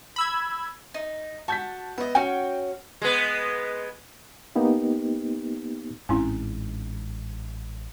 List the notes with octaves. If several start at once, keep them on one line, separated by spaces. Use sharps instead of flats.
B5 E6 G#6
D#4
F#4 A5 G6 B6
B3 D#5 E5
C#4 F#4 G5
G#3 B3
A#3 B3 D#4 G4
A1 G#2 C4 C#4 E4